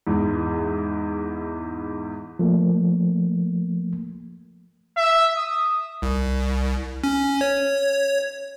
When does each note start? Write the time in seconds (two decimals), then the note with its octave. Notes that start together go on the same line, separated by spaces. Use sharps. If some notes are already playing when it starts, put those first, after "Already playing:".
0.07 E2 G#2
2.39 F3 A3 A#3
4.97 E5
5.36 D#6
6.02 C2
7.04 C#4
7.41 C#5